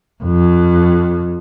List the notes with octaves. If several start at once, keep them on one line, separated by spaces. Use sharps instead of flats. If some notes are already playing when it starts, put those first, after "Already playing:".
F2